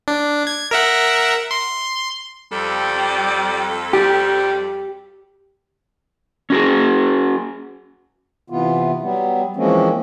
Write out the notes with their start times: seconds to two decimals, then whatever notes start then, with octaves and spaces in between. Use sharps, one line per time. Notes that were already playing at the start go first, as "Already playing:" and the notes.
0.08 D4
0.47 G#6
0.71 A#4 E5 F#5
1.51 C6
2.52 F2 G3 A4
3.93 G3 G4
6.50 C#4 F#4 G#4
8.50 C3 E3 B3 F4
9.02 F#3 G3 B3
9.56 E3 F3 G#3 A#3 C4 C#4